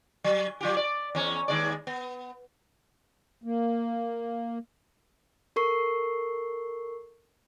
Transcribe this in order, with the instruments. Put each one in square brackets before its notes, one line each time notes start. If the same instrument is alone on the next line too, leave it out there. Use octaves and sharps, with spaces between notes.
[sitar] F#3
F#3 F4 G4
D5
E2 C#4
D#2 G#3 D5
B3
[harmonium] A#3
[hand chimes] A4 A#4 C#6 C7